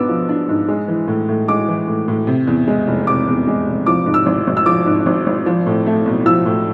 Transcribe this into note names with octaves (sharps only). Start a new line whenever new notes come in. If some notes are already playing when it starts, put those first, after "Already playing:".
Already playing: G#2 B3 D4 D6 E6
F3
D4
G#2
G#3
E3
A2
A2
G#3 D6
E3
A2
A2
C3
E2
G#3
F1
C3 D6
E2
G#3
F1
F3 D6
G#2
E6
G#1
G#1
E6
F3 D6
G#2
G#1
G#1
F3
A2
A3
B1
F3 E6
A2